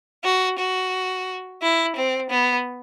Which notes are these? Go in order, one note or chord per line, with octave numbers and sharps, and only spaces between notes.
F#4
F#4
E4
C4
B3